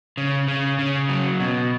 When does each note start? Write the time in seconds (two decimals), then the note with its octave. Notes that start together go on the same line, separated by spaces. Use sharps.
0.17 C#3
0.48 C#3
0.79 C#3
1.09 F#3
1.40 B2